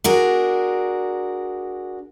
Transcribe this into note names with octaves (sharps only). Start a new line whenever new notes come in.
D4 F#4 G#4 A#4